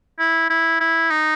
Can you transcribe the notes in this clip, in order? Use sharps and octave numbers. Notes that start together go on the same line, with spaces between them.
E4
E4
E4
D#4